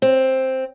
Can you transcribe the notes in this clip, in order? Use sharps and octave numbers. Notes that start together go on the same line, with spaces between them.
C4